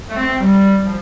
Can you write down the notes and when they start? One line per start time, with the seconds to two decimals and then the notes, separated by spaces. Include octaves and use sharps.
0.09 A3
0.16 C4
0.40 G3
0.85 F3